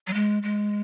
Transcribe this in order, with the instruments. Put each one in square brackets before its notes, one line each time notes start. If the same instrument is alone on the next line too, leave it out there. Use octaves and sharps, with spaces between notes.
[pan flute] F#3
G#3
G#3